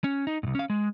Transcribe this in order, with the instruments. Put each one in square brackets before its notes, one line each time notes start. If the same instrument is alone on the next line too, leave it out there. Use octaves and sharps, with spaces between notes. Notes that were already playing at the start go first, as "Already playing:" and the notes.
[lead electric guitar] C#4
D#4
C2 G#2
C#4 F5
G#3